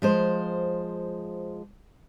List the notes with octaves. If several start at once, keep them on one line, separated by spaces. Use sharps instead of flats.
F3 G#3 C5